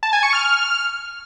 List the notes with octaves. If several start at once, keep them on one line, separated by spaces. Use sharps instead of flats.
A5
G#5
C#6
F6